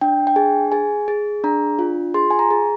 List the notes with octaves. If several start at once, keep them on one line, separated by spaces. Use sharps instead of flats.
D4 G5
G5
G#4 G#5
G#4 G#5
G#4
D4 A#5
F4
G#4 C6
G#5
A#5
G#4